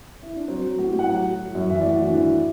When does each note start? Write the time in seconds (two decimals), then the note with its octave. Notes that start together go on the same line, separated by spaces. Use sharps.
0.23 E4
0.36 D4
0.48 F#3 C4
0.64 F#3
0.79 A2 F#4
0.89 G4
0.93 A2
0.99 F#5
1.09 F#3 F#5
1.25 F#3
1.40 F#3
1.55 F#2
1.70 E3 E5
1.81 D5
1.85 A2
1.91 F#4
2.01 E3 E4
2.10 D4
2.16 E3 E4